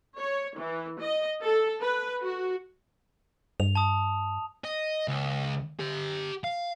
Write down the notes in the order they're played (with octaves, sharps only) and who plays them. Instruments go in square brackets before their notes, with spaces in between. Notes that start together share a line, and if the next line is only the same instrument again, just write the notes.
[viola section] C#5
E3
D#5
A4
B4
F#4
[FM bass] G2 [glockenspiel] F7
[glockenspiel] A5 D#6
[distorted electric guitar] D#5
C#2
G4 A#5
F5